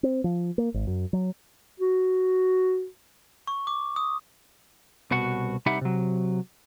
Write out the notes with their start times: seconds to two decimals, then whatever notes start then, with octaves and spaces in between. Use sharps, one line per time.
0.03 C4
0.24 F3
0.58 A#3
0.74 G#1
0.87 F#2
1.13 F#3
1.80 F#4
3.47 C#6
3.67 D6
3.96 D#6
5.11 C2 B2 F#4 F#5
5.66 C2 D#4 G4 E5 F#5 B5
5.81 C3 F#3